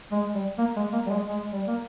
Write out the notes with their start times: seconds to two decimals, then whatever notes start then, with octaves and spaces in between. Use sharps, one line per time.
0.12 G#3
0.35 G3
0.58 A#3
0.76 G#3
0.93 A#3
1.07 G3
1.11 G#3
1.29 G#3
1.53 G3
1.68 A#3